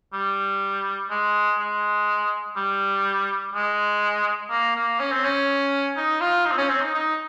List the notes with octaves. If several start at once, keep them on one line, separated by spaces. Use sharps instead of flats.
G3
G#3
G#3
G3
G#3
A#3
A#3
C#4
C4
C#4
D#4
F4
D#4
C4
C#4
C4
D#4
D#4